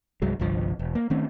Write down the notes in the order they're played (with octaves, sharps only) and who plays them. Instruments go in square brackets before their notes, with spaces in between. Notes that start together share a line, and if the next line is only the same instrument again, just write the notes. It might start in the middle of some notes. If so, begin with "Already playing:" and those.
[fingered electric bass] C2 G2 F#3 G#3
G1 C2 G2 F3
E1
A#3
D#3 A3 C4 C#4